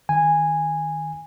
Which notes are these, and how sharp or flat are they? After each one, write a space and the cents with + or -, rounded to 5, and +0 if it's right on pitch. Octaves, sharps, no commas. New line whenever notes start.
D#3 +0 G#5 -10